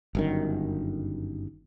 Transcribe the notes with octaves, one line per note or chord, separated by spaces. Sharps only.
G1 F#2 D#3